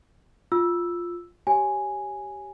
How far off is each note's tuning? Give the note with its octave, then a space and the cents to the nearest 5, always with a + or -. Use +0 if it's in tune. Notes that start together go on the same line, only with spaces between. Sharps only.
F4 +0 E6 +0
G4 -15 C#5 -5 G#5 +0